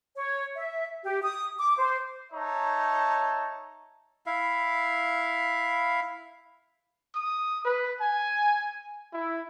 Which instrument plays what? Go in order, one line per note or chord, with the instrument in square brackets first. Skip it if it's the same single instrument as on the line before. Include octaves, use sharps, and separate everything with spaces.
[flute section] C#5
E5
G4
D#6
D6
C5
[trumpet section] D#4 C#5 E5 A5
[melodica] E4 E5 F5
[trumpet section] D#6
B4
G#5
E4